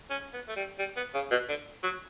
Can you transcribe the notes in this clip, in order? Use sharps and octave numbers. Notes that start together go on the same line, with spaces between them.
C#4
B3
A3
G3
G3
B3
C#3
B2
D3
F#3